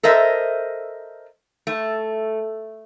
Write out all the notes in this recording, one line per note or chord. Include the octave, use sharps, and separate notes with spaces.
A4 A#4 C5 D#5 E5
A3